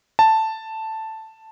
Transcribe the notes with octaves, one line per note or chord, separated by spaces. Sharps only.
A5